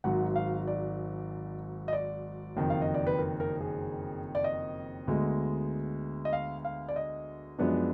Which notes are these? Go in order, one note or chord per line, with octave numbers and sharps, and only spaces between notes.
G#1 G#2 F#3 F#5
F5
D5
D#5
D5
F#1 F2 D#3
F5
D#5
D5
B4
A#4
A#4
G#4
D5
D#5
D2 D3 G#3 B3
D#5
F5
F5
D5
D#5
F#2 F3 G#3 B3 D4